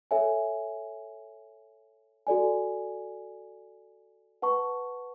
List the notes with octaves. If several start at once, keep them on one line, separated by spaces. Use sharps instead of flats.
A4 C#5 E5 G#5
F#4 A4 D5 G#5
B4 F#5 A5 C#6